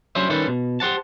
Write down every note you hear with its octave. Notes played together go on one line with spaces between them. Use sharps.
F#3 C#4 D4 E4 C5 E5
D#3 G3 C#4 A4 B4 C5
B2
G4 C5 F#5 A5